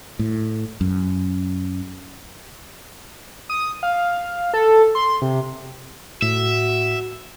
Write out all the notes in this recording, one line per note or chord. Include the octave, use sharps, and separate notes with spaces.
A2
F#2
D#6
F5
A4
C6
C3
A2 F#4 E5